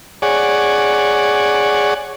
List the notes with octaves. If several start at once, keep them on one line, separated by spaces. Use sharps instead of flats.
G#4 C#5 D5 F#5